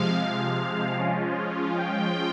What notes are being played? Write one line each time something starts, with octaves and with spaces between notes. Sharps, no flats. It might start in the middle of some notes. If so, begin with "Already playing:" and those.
Already playing: C3 F3 G#3 F5
F3 G#3 C#4 F4
G5